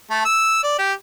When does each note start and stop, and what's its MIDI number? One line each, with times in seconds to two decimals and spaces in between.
0.11 0.21 57
0.25 0.61 88
0.64 0.74 74
0.79 0.92 67